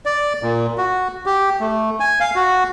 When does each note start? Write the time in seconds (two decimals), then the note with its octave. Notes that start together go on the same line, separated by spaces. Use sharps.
0.06 D5
0.43 A#2
0.78 F#4
1.26 G4
1.60 A3
2.00 G#5
2.20 F5
2.36 F#4